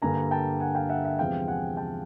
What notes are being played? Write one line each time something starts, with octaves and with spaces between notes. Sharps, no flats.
G2 D3 G3 A#3 D4 G#5 A#5
G5 A5
F#5 G#5
F5 G5
E5 F#5
E5 F#5
E2 C3 F3 G#3 C4 F5 G5
F#5 G#5
G5 A5